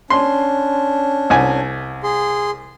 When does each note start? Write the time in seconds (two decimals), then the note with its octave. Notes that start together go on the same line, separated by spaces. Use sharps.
0.10 C#4 D4 C6
1.30 C2 G#5
2.03 G#4 C6